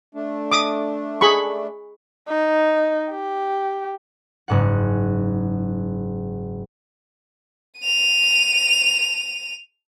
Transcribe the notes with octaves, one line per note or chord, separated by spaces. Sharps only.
A3 D4
D6 D#6
G#4 B5 C#6
D#4
G4
F#1 G#2 F#5
D#7 F7